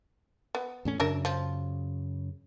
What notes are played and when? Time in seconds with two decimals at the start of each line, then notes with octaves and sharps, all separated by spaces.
0.55 B3
0.85 E2 A2 C#4
1.00 F#2 C#3 D4 A#4 E5
1.25 F3